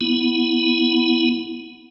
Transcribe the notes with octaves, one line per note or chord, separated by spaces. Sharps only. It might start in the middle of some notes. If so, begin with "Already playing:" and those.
B3 E4